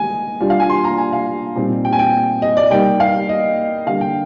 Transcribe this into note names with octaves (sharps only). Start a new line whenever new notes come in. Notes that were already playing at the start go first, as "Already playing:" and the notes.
Already playing: D#3 G#3 D#4 G#5
G3 D4 F4
F5
G#5
C6
A#5
G#5
F5
A#2 G3 C4 D#4
G5
G#5
G5
D#5
D5
G3 A#3 D#4 G5
F5
D#5
D3 G3 A#3 F5
G5